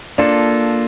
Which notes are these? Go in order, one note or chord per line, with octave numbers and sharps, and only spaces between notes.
A#3 D4 F4 A4